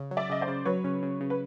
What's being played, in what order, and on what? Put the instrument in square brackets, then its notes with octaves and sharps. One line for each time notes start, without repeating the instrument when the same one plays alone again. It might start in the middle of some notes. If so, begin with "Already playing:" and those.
Already playing: [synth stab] C#3
F#3
[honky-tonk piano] D5 E5
[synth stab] C#3 [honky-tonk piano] D#5
[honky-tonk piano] C5 D5
[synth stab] C#3
[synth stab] F#3 [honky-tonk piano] B4 C#5
[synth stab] C#3
C#3
C#3
[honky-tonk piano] B4